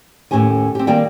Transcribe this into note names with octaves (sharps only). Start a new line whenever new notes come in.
D#2 A2 E3 C#4 G4 G#5
C4 G4
D#3 G3 A#3 D5 G5